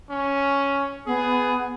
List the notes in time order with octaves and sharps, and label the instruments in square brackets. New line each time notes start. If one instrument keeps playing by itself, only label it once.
[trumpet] C#4
[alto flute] B3 [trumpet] G#4